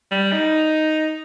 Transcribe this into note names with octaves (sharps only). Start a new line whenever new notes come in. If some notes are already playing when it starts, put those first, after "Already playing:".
G3
D#4